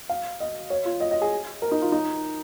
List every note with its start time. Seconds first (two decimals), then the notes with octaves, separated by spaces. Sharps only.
0.09 F5
0.40 D#5
0.70 C#5
0.85 F4
1.00 D#5
1.11 D#5
1.22 G#4
1.62 A#4
1.71 D#4
1.82 F4
1.92 D#4